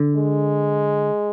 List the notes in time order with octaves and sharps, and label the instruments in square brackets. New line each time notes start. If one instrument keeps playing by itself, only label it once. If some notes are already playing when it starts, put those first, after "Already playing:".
Already playing: [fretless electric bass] D3
[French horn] G#3